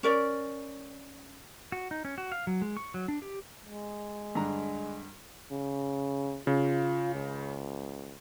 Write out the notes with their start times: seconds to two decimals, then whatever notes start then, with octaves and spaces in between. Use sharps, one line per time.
0.03 C#4 A#4 D5
1.72 F#4
1.91 D#4
2.05 C#4
2.18 F#4
2.32 F5
2.47 F#3
2.62 G#3
2.77 C#6
2.94 F#3
3.08 D4
3.22 G4
3.63 G#3
4.35 G2 D3 A#5
5.51 C#3
6.47 C#3 F4
7.15 C#2